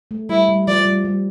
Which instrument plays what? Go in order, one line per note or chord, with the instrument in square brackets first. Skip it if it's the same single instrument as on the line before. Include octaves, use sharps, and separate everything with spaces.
[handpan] A3
[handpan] G3 [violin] E4
[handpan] G3
[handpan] F3 [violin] D5
[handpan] G3
G3